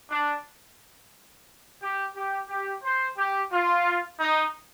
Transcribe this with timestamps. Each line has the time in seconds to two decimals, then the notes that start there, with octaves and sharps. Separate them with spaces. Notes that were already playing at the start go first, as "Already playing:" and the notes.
0.11 D4
1.81 G4
2.15 G4
2.49 G4
2.83 C5
3.17 G4
3.52 F4
4.20 D#4